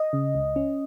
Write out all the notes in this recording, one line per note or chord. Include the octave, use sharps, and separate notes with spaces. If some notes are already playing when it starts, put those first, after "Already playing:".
Already playing: D#5
C#3
C#2
C#4